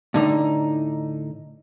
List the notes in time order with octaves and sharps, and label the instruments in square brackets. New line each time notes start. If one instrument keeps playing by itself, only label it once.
[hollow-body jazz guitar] A2 D3 D#4